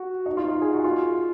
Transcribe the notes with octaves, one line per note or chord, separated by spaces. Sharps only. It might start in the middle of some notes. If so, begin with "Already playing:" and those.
Already playing: F#4
D#4
F4
D#4
G#4
F#4
F4